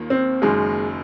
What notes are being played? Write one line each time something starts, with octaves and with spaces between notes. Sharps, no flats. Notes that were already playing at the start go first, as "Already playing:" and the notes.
Already playing: D#2 D#3 A#3 F4
C4
F#1 F#2 D#3 G#3